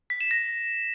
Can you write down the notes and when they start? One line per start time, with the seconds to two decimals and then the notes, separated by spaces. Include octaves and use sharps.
0.10 B6
0.21 E7
0.31 A#6